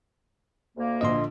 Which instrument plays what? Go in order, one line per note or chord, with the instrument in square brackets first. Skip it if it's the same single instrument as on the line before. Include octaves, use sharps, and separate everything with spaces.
[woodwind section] D2 A#3
[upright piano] A#1 D3 F3 [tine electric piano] D#5 C6